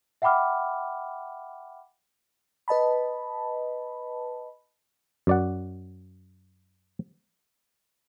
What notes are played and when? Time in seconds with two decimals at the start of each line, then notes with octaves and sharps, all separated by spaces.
0.22 E5 F#5 G5 B5 D6 F6
2.68 B4 D#5 A5 B5
5.27 F#2 D5 F#5